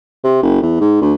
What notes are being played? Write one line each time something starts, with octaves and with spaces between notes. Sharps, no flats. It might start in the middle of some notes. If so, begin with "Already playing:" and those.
C3
F#1
E2
G#2
D2